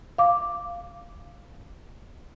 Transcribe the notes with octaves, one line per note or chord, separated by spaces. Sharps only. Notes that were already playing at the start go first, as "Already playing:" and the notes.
F5 D6